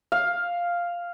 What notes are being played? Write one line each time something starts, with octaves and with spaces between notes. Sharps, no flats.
F5